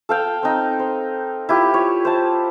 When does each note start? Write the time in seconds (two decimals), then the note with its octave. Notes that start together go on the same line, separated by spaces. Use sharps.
0.09 A4 F5 G5
0.43 C4 D#4
0.80 C5
1.49 E4 F4 G4
1.74 C#5
2.05 C5 A5